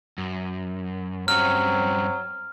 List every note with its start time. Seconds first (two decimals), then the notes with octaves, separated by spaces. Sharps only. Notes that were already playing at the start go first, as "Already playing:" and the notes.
0.18 F#2
1.28 G2 F#3 G3 C4 C#4 F6